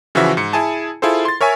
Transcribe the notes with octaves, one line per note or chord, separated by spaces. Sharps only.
C#3 E3 F3 F#4 E5
G#2 C#7
E4 G#4 G#5 A5
E4 F4 G#4 A4 C5
C6 A6
A#4 C#5 E5 G#5